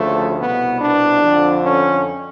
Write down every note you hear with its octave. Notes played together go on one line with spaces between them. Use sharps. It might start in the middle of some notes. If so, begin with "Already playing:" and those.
Already playing: D2 C#3 F3 A3
C2 B2 B3
D4
F2 D3 F3
C#4